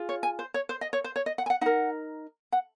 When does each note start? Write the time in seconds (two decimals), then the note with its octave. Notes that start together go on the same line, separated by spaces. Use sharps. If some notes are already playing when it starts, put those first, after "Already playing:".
Already playing: F4 G#4
0.09 C#5
0.23 G#5
0.39 C5
0.54 C#5
0.69 C5
0.81 D#5
0.93 C#5
1.04 C5
1.16 C#5
1.26 D#5
1.38 F#5
1.46 G#5
1.50 F#5
1.61 D#4 A#4 F#5
2.52 F#5